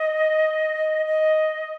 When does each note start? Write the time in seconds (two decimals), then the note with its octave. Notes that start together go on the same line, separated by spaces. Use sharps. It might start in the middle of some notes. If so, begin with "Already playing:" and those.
Already playing: D#5
1.06 D#5